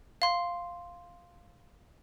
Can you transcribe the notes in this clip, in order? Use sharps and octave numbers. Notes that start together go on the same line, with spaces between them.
F5 C6